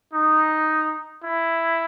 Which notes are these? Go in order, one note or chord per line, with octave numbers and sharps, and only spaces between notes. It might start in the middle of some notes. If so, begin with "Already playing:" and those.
D#4
E4